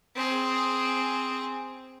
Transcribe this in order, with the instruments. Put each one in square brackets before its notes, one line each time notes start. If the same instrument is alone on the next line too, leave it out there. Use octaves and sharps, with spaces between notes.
[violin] C4 G#4